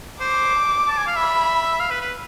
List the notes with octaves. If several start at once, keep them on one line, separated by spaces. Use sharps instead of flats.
C5 D6
A5
G#5
F5
E5 B5
F5
B4
B4